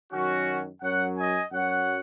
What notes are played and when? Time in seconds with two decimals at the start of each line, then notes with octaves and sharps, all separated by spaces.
0.12 F#2 D#3 F#3 C#4 F#4
0.82 F#2 F#3 C#5 F#5
1.17 D#5 G#5
1.52 F#2 F#3 C#5 F#5